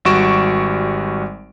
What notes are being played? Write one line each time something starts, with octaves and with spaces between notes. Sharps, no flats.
G#1 G3 F#4 C#6 D7 E7